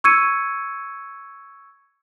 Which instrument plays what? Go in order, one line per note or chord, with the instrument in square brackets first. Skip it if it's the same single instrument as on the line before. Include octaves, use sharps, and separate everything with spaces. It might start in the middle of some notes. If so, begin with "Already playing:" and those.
[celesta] C#6 E6 G#6 C#7 D#7